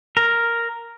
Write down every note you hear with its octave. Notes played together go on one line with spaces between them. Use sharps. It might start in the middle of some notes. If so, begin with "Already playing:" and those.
A#4